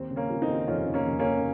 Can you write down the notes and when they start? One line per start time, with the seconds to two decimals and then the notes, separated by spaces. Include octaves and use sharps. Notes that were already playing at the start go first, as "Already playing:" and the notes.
Already playing: D#2 C4
0.11 C#3
0.16 A#3 C#4
0.30 F3
0.42 C4 D#4
0.48 D#2
0.68 F1 C#4 F4
0.88 C#3
0.94 A#3 C#4
1.07 F1
1.19 A#3 C#4
1.27 C#3